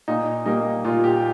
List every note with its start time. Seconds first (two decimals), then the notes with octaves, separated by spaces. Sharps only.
0.08 A#2 D#4
0.46 G3 A#3 D#4
0.85 A#2 F4
1.04 G4